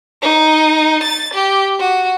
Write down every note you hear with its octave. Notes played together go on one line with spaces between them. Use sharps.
D#4
A6
G4
F#4